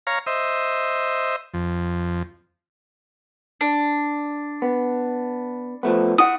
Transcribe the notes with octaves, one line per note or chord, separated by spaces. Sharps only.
C#5 F5 A#5
C5 D#5 E5
F2
D4
B3
F3 A3 B3
E4 F#5 D#6